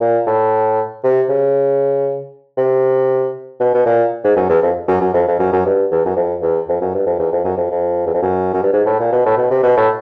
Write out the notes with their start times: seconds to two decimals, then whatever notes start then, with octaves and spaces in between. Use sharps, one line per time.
0.01 A#2
0.27 A2
1.04 C3
1.29 C#3
2.57 C3
3.60 B2
3.74 B2
3.86 A#2
4.24 G#2
4.36 F#2
4.50 E2
4.62 F2
4.88 F#2
5.01 F#2
5.14 F2
5.28 F2
5.39 F#2
5.52 F#2
5.66 G2
5.91 E2
6.05 F#2
6.16 F2
6.42 E2
6.69 F2
6.81 F#2
6.94 G2
7.06 F2
7.19 E2
7.32 F2
7.45 F#2
7.57 F2
7.71 F2
8.07 E2
8.14 F2
8.22 F#2
8.53 F#2
8.63 G2
8.73 G#2
8.86 A2
9.00 A#2
9.12 B2
9.26 A2
9.37 B2
9.50 C3
9.63 B2
9.77 A2